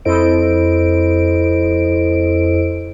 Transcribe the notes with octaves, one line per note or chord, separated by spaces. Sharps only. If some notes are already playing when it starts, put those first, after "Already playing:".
F2 E4 A4 C5 D#5 D7